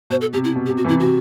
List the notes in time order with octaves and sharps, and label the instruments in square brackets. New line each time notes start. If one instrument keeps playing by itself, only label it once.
[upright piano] B2 [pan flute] C5
[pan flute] A4
[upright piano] C3 [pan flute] G4
[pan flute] E4
[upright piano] B2
[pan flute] G4
[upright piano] C3
[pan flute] F#4
[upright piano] C3 E3
[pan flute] E4
[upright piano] C3 [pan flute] F#4